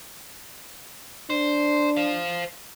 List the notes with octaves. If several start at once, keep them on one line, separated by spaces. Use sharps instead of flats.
D4 C5
C5 F5